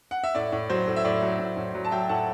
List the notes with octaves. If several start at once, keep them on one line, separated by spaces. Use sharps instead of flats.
F#5
E5
A2 D5
A2
F#3 C5
A2
E5
A2 D5
F#3
A2
A2
F#3
A5
F#3 E5 G5
A2 F#5 A5